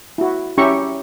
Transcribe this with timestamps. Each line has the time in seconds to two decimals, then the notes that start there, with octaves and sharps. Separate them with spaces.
0.18 E4 F#4
0.58 C#4 E4 G4 E5 A#5 C#6